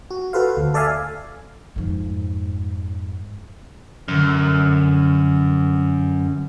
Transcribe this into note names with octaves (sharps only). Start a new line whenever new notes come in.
F#4
F#4 A4 B4 C5 F5
D2
A4 D5 E5 F5 G#5
F2 G#2
F1 F#2 D3